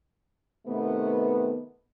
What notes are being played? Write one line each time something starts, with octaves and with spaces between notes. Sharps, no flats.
C3 D#3 A3 B3